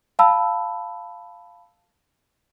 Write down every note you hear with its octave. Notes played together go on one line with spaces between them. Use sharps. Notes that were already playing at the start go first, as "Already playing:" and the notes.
F5 A5 B5 E6